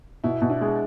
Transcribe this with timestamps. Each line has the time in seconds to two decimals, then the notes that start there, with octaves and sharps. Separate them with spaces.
0.24 B2 E4
0.42 B2
0.50 D4 E4
0.61 G#3